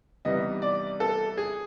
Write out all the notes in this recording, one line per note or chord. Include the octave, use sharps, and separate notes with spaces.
C3 E3 G3 B3 D#4 D#5
D5
A4
G#4